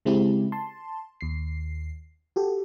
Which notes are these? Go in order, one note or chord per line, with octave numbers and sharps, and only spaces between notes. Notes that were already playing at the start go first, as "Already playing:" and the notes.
C#3 G#3 C4 E4 G4
A5 C6
D#2 C7
F#4 G4 A4